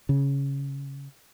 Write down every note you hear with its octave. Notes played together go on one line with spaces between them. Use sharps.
C#3